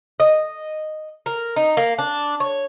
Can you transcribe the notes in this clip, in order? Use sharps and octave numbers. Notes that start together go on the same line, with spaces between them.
D#5
A#4
D#4
A#3
D4
C#5